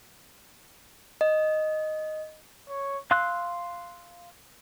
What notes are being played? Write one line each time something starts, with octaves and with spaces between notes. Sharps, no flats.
D#5
C#5
F5 C6 E6 F#6